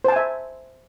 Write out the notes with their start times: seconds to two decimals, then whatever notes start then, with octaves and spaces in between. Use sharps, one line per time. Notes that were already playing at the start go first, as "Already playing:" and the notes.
0.04 C5
0.08 A5
0.12 G#5
0.16 E5